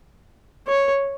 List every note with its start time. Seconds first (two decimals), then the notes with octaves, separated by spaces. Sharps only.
0.67 C#5